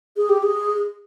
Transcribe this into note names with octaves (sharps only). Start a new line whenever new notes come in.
G#4
G4
G#4